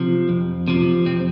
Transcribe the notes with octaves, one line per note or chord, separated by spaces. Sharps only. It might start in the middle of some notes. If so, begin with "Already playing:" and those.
Already playing: C3 F3
F2
C3 F3
F2 C4